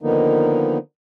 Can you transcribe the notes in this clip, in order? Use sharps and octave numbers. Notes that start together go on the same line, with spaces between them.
D3 D#3 F3 A#3 B3 D#4